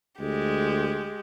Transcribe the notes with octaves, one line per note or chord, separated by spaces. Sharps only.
D2 G#3 G4